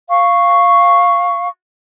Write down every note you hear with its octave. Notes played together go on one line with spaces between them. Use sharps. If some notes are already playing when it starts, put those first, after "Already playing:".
F5 C#6